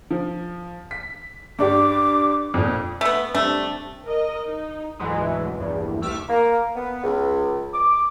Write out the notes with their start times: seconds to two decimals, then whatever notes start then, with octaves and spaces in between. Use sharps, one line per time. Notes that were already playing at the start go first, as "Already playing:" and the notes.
0.11 F3
0.91 B6
1.59 G2 D4 G4 D6
2.54 F2 A#2
3.01 A3 B3
3.35 G3 A3 C4 D4
4.05 A#4 D#5
4.45 D#4
4.99 D2 G#2 B2 E3 F#3 G#3
5.60 A#1 E2 G2
6.02 C2 A3 E5 D6 F6
6.29 A#3
6.75 B3
7.03 C#2
7.74 D6